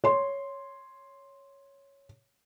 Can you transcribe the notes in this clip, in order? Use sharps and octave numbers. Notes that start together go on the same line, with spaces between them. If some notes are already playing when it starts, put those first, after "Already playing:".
C#5 C6